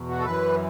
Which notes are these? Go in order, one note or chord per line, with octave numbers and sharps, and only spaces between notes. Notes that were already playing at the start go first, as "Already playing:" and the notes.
Already playing: E2 B2
F#4
A4
F#2 E3 B4